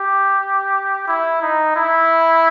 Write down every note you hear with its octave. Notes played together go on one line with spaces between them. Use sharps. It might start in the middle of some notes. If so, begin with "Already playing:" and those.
Already playing: G4
E4
D#4
E4